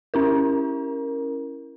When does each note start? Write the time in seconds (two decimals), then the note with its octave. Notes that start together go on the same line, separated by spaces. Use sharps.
0.14 C#4 E4 A#4